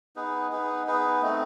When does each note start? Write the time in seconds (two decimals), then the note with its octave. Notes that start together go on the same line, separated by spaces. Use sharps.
0.16 B3 D#4 G#4 B4
0.51 B3 D#4 G#4 B4
0.87 B3 D#4 G#4 B4
1.22 A3 C4 D#4